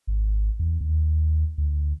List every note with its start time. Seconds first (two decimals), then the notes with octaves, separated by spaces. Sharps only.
0.07 G#1
0.59 E2
0.81 D#2
1.58 D2